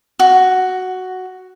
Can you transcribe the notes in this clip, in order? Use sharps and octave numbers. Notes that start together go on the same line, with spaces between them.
F#4